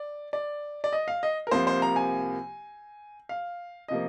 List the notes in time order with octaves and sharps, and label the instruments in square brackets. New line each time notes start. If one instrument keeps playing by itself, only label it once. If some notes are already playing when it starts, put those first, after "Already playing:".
Already playing: [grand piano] D5
D5
D5
D#5
F5
D#5
A#4
C2 C3 F3 A#3 C5
C5
A#5
G#5
F5
C3 F3 A#3 D#5